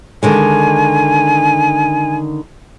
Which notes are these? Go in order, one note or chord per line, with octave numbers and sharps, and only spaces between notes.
D3 D#3 G#3 G#5